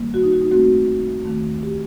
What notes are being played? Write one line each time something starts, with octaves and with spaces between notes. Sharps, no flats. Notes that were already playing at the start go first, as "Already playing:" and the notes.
Already playing: G2 D#3 G3 A#3
F#4
D#4
F#4
D#4
F#2 F#3 A3 C4 F#4
D#2 D#3 A3
G4